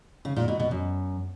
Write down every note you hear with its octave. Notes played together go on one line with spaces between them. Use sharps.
C#3
A#2
B2
B2
F#2